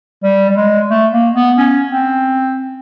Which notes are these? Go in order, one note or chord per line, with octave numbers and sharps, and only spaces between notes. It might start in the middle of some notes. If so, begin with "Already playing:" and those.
G3
G3
G#3
A3
A#3
B3
C#4
C4